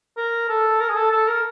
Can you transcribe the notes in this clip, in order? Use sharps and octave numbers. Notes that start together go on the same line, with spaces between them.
A#4
A4
A#4
G#4
A4
A4
A#4